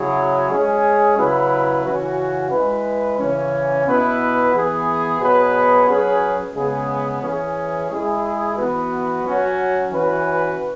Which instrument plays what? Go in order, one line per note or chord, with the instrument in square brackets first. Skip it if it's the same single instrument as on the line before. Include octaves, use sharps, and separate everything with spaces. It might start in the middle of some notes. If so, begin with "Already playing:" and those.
Already playing: [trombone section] C#3 F#3 E4 G#4
G#3 C#4 G#4
C#3 F#3 E4 B4
C#3 E3 C#4 F#4
G#3 E4 B4
C#3 E3 C#4
B2 B3 E4 B4
E3 B3 G#4
B2 F#3 B3 G#4 B4
F#3 C#4 G#4 B4
C#3 G#3 B3 G#4
E3 C#4 G#4
G#3 E4 G#4
E3 B3 F#4 B4
F#3 C#4 F#4
E3 C#4 F#4 B4